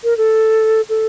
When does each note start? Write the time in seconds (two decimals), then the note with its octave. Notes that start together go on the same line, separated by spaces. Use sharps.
0.04 A#4
0.17 A4
0.89 A4